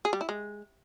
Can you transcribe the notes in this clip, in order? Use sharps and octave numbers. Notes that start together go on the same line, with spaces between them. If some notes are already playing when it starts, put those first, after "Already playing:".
G#4
G3
E4
G#3